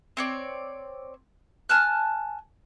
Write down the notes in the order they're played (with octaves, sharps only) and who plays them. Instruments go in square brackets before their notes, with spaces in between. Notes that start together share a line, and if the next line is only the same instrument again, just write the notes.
[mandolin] C4 C#5 D5
G#5 A5 F6 F#6